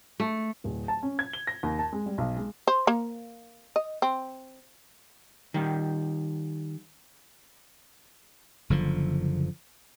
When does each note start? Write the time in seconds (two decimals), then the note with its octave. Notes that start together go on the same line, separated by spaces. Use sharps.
0.20 A3
0.64 D1
0.88 A5
1.03 C#4
1.19 G#6
1.33 G7
1.47 A#6
1.63 D#2
1.79 A5
1.93 G#3
2.06 G3
2.18 B1
2.37 G#3
2.68 C5
2.87 A#3
3.76 D#5
4.02 C4
5.54 D#3 G3
8.70 F#1 D3 F3